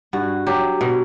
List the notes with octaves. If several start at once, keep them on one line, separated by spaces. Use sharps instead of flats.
G2 F#4
F#3 G4
B2